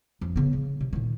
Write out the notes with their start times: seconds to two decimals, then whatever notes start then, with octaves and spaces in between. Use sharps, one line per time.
0.21 F2
0.36 C#3 B3
0.53 C#3
0.81 C3
0.93 A#2 D#3